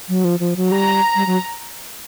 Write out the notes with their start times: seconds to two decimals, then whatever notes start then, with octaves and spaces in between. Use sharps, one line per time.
0.09 F#3
0.24 F3
0.40 F3
0.56 F#3
0.72 G3 A#5
1.16 G3
1.26 F#3